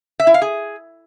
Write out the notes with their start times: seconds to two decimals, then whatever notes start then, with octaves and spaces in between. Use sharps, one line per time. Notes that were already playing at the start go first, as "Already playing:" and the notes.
0.20 E5
0.27 E4
0.34 F5
0.42 G#4